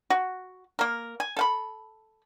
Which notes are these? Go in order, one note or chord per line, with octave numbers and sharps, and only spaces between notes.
F#4
A#3 A#4
G#5
A4 F5 B5